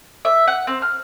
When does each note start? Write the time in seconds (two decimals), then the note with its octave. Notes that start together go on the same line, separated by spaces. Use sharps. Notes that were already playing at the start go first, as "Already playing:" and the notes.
0.25 E5
0.47 F#5
0.67 C4
0.82 F6